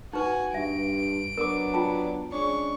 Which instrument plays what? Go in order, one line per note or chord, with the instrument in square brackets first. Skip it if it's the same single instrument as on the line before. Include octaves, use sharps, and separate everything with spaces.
[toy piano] D#4 B4 [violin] F#4 G#5
[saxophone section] G2 [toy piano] E5 [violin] D7
[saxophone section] F#3 B3 D4 [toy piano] A#4 D6
[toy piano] F4 G5 A5
[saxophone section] G#3 C#4 D4 [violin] C#6